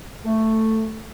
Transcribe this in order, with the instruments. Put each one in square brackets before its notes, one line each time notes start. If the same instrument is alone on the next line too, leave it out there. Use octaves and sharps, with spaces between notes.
[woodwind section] A3